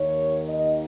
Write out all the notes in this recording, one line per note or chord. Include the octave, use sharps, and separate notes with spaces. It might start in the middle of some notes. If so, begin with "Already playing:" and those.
Already playing: D#2 D#3 C#5
D#5